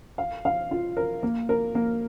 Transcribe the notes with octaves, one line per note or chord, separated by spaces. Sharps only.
F5
F5
F4
A#4
A#3
A#4
A#3